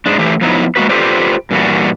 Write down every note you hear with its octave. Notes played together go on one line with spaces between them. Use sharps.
G#2 G#3 D4
E3 A3 G4
F3 F#3 B3 D#4 E4
G#3 A#3 F#4 B4
F4 G4 A4 B4 C5 D5
G2 A#2 E3 G3 D4 F#4